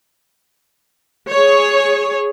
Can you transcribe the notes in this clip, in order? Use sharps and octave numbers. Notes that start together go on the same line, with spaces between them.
G#4 C#5